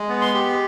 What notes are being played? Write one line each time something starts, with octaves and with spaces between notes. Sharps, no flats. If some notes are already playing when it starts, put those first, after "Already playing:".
Already playing: G#3
B3
C6
G4